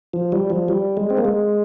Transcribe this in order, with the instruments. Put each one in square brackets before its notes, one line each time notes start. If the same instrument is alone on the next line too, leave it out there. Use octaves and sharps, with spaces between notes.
[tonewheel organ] F3
G3
F3
G3
G#3
C4
A#3
G#3